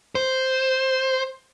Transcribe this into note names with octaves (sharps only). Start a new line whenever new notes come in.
C5